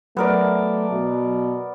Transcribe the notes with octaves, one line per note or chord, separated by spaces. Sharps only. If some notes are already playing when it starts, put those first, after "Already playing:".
F#3 A3 B3 A#4 D5
B2